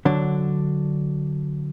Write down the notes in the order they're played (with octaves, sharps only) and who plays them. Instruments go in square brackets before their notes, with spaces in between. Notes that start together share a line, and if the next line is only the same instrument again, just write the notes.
[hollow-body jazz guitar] D3 F#3 D4